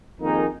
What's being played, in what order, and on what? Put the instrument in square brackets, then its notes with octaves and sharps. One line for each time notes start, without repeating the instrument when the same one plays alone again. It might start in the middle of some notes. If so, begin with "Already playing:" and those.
[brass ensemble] F2 D#3 A#3 D#4 G#4